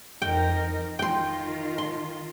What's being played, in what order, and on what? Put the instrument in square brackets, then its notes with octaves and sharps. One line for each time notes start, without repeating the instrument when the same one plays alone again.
[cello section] F2 D#4 A#4 [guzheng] G5
[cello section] D#3 F4 [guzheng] G5 C6
[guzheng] C6